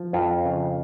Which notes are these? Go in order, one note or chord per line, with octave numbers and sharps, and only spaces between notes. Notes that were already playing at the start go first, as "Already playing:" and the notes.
Already playing: F3
F2 F4
C#3